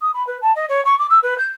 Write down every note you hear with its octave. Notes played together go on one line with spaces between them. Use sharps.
D#6
B5
B4
A5
D#5
C#5
C#6
D6
E6
B4
G6